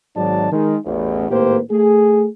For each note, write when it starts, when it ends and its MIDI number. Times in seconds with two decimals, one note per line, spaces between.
0.16 0.50 32
0.16 0.50 44
0.16 0.50 54
0.16 0.50 63
0.16 0.50 74
0.16 0.50 81
0.52 0.77 51
0.52 0.77 56
0.86 1.27 33
0.86 1.27 40
1.30 1.60 32
1.30 1.60 45
1.30 1.60 58
1.30 1.60 67
1.30 1.60 71
1.30 1.60 72
1.71 2.26 57
1.71 2.26 68